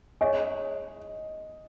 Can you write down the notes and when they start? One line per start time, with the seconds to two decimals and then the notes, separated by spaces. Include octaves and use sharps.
0.21 G#4 C#5 D#5 G#5 C#6